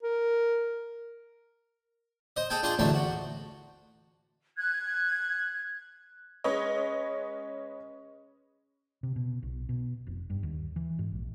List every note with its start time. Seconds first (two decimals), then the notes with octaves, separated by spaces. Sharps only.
0.03 A#4
2.36 C5 D#5
2.50 G#4 A4 G5 G#5
2.63 D4 F4 G#4 G5 A5 C6
2.79 A1 D2 A3 C4 D4 C6
2.94 F#4
4.58 F#6 G#6
6.44 G#3 C#4 B4 C#5 D#5
9.03 C3
9.16 B2
9.43 B1
9.69 B2
10.07 F1
10.30 G2
10.43 D#2
10.76 E3
10.99 G#2
11.12 A#1